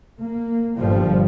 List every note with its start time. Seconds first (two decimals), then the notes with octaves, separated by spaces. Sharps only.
0.21 A#3
0.77 G1 A#2 F3 G3